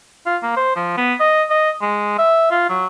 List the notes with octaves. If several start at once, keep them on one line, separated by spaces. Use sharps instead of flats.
F4
A#3
C5
F3
B3
D#5
D#5
G#3
E5
F4
F#3